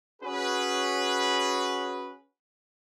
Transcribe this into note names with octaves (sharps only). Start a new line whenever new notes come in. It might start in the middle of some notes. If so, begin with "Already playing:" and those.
C#4 F#4 G#4 B4